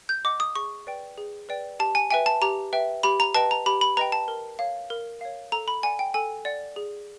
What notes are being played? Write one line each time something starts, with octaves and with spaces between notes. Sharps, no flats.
G6
D#5 F#5 D6
D#6
G#4 C#6
B4 D5 G5
G#4
B4 D5 G5
G4 A5
G#5
B4 E5 G5 G#5
A5
G4 A#5
B4 E5 G5
G4 B5
A#5
B4 D#5 G5 A5
A#5
G4 B5
B5
B4 D#5 G5 A#5
A5
A#4
C#5 F5
A#4
C#5 F5
A4 A#5
B5
D5 F#5 G#5
G5
A4 G#5
D5 F#5
G#4